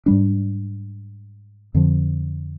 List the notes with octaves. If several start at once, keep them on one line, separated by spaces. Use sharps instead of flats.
G#2 G3 D4
F2 D3 F3